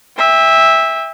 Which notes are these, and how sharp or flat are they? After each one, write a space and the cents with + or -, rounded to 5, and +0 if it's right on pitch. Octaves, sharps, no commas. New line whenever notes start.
E5 -10 G5 +40